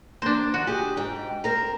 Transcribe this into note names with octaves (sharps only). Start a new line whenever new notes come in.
A#3 D4 C5
D#3 F#4
G4 G#4
G#2 G5
C4 A#4 A#5